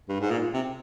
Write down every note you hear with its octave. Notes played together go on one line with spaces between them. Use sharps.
G2
G#2
A#2
C3